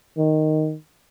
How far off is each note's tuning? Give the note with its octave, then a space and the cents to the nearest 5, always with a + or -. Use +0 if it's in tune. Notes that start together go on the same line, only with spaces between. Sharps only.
D#3 -5